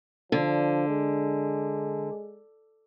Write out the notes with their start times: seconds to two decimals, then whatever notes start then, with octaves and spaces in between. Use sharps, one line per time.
0.32 D3 F3
0.88 G#3